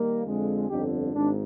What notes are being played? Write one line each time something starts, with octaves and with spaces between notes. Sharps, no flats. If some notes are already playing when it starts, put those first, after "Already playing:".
Already playing: D#3 G3 A#3
F2 D3 F3 G#3
G1 F2 D3 D#4 G4
G#1 G#2 D4